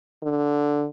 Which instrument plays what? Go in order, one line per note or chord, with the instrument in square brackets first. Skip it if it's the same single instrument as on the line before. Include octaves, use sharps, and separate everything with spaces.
[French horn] D3